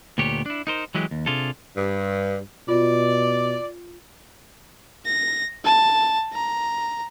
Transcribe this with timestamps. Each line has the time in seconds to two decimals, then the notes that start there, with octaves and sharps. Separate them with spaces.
0.18 D2 A#2 B3 G4 C#5
0.46 D4 E4
0.67 D#4 A#4 C5
0.95 E3 F#3 G#3 G4
1.11 D#2
1.26 C3 D4 F4 G#4 A4
1.77 G2
2.68 B2 F4 D5
5.06 A#6
5.65 A5
6.34 A#5